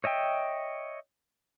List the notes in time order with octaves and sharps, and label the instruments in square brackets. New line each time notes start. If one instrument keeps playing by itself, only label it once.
[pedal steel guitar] C#5 D#5 E5 G5